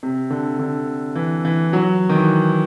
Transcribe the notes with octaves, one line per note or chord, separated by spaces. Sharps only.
C3
D3
D3
E3
E3
F#3
D#3
E3